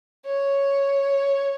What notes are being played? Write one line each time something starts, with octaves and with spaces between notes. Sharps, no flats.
C#5